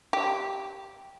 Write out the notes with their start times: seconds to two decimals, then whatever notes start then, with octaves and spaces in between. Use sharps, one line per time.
0.13 G4